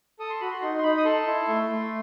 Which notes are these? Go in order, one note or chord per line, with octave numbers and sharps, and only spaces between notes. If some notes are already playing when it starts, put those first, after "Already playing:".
A4 D#6
C6
F#4 B5
C6
D#4 C6
C6
D#4 B5
D#6
A4 C6
E4
A3
A3